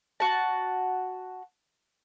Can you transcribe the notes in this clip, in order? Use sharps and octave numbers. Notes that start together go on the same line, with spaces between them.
F#4 A5